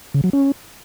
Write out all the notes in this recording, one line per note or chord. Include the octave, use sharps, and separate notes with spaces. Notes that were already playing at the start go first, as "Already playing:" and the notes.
C#3
F#3
C#4